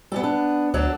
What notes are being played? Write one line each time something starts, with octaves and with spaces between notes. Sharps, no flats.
G3 B3 G4 A4
B3 D4
D2 F#3 D4 A4